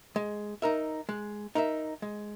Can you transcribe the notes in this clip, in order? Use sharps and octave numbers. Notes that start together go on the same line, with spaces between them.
G#3
D#4 A#4 E5
G#3
D#4 A#4 E5
G#3